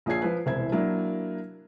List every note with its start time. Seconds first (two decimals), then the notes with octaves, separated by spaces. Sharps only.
0.06 A#1 F4 G#4 C#5 G#6 C7
0.22 F3 B4
0.46 E1 C2 E4 C5 G#6
0.72 F#3 A#3 D4 E4